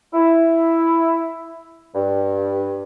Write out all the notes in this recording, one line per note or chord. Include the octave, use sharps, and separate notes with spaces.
E4
G2